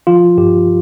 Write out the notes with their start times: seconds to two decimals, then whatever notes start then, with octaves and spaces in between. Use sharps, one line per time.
0.07 F3 F4
0.37 G2 G4